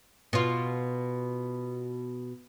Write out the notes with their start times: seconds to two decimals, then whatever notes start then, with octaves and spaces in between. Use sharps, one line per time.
0.33 B2 F4